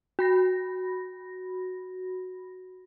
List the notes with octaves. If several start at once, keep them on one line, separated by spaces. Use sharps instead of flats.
F#4 B5 A#6